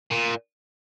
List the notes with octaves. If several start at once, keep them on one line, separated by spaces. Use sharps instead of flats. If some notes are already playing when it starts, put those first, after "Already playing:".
A#2